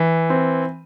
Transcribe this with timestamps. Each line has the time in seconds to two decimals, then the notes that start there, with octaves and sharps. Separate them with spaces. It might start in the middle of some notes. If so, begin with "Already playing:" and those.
Already playing: E3
0.30 C4